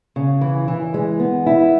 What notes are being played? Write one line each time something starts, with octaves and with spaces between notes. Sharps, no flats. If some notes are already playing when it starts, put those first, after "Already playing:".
C#3
E3
E3
G#3
B3
E4